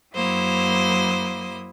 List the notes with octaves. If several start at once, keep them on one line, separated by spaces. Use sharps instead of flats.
F#2 F#3 A#3 E4 C5 D#6